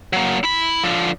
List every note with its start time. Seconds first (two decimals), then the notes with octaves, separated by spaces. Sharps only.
0.13 F#3 A#3
0.44 E4 B5
0.84 D3 F3